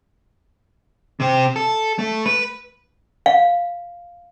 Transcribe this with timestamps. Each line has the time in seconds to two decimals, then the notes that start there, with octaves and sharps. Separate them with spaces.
1.20 C3 C4
1.56 A4
1.99 A3
2.26 B4
3.26 F5